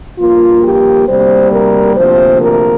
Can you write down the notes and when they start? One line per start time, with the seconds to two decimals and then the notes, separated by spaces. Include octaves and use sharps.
0.19 G2 F3 A#3 F4
0.63 G4
1.07 D2 C3 G3 A#3 C5
1.52 A#4
1.97 D2 C3 F3 A#3 C5
2.41 A#4